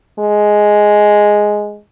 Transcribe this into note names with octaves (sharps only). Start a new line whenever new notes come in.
G#3